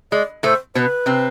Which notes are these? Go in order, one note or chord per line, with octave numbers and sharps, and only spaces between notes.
G#3 D5
A2 A3 C5
B2 B3 B4 C5
C3 C4